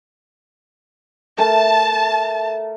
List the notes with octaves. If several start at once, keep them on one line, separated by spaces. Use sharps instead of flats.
A3 A#4 A5